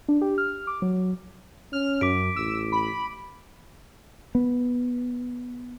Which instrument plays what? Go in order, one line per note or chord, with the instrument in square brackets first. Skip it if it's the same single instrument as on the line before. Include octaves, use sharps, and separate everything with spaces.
[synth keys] D4
G4
F6
D6
F#3
[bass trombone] C#4 [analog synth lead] F6
[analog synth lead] F#2 [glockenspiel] D6 B6 D7
[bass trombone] A1 [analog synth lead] E6
[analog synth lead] B5
[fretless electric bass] B3